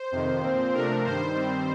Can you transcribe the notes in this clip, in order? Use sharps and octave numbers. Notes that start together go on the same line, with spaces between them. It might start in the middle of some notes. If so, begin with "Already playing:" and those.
Already playing: C5
F2 C3 D#3
A#2 F3 C4
C3 F3 A3 D4 A#4
G2 D#3 G3 C5
G2 D#3 G3 C4